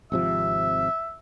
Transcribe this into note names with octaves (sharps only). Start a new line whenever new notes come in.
G#1 C3 F3 E5